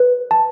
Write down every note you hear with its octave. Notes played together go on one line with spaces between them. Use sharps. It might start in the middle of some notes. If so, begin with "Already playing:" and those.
Already playing: B4
A5